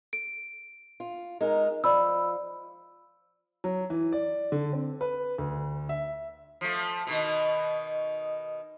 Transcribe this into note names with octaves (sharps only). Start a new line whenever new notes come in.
D7
F4
G#3 D#4 A#4
F3 D5 B5 E6
F#3
E3
D5
D3
C4
B4
D2
E5
F3 A3
B2 D#3